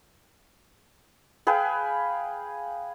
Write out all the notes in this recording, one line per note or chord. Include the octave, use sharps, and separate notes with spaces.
G#4 B4 F5 G5